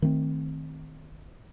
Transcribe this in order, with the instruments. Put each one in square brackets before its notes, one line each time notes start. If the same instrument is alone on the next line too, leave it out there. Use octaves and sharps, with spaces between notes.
[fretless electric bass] D#3 A3 B3 C4